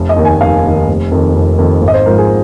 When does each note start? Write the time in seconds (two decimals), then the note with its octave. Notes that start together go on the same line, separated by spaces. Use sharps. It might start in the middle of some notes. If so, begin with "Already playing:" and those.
Already playing: F1
0.09 D#5
0.16 D#2 D#3
0.25 G#5
0.41 F1 F5
0.64 D#2 D#3
0.88 F1
1.12 F2 D#3
1.35 F1
1.59 F2 D#3
1.82 G#1
1.88 D#5
1.94 C5
2.06 G#2 F3 A#4
2.18 G#4